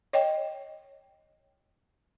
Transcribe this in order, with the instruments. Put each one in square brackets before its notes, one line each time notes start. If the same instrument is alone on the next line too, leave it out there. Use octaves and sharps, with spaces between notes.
[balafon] C#5 D#5 G5